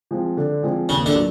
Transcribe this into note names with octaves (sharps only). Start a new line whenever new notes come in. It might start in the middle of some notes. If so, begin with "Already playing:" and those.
F3 G#3 C4
D3
F3 G#3 C4
D#2 C#3
D3
F#3